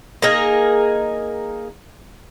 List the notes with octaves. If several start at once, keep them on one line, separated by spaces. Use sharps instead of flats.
A#3 D#4 G#4 A#4